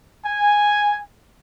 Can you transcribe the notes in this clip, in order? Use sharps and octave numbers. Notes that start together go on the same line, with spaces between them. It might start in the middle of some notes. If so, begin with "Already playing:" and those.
G#5